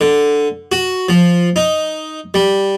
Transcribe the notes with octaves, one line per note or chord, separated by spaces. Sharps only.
D3
F#4
F3
D#4
G3